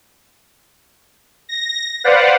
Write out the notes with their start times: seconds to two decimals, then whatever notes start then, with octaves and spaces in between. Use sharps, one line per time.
1.49 A#6
2.04 B4 C5 D5 F5 F#5